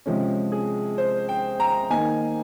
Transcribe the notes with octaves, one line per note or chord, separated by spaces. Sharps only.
C3 F3 G#3 C#4
G#4
C5
G5
A#5
D#3 A#3 D#4 G#5